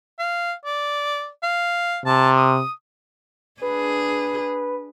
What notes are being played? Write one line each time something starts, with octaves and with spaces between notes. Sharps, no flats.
F5
D5
F5
C3 A5
D#6
D4 G#4 B4